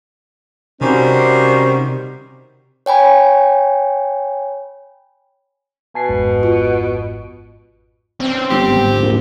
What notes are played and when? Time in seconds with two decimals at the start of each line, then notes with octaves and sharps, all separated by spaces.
0.81 C3 D#3 G3 C#4 F#4 C5
2.86 C#5 G5 G#5 B5
5.95 B2 G#5 A5 C7
6.09 G#1 F2 G#2
6.43 F4
8.20 C4 C#4 C5
8.51 G1 G4
8.68 D#2 G#2
9.02 A#1